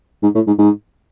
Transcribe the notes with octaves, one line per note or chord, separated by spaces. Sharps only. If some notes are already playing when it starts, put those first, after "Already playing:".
G#2
A2
G#2
G#2